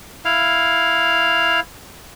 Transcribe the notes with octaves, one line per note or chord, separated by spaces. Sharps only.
E4 F5